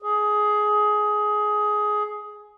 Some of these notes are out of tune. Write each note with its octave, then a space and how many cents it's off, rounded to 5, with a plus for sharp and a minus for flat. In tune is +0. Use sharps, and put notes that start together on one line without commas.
G#4 +15